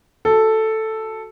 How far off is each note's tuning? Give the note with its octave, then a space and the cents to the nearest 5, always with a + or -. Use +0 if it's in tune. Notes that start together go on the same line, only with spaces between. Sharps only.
F#4 +0 A4 +0